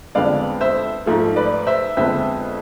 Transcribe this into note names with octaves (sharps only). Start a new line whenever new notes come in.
F2 D3 G#3 B3 D5 F5
C5 E5
G#2 F3 A3
B4 D5
C5 E5
F2 D3 G#3 B3 C5 E5